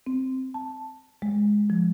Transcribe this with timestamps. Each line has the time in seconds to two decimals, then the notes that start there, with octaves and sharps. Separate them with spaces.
0.06 C4
0.54 A5
1.22 G#3
1.70 F3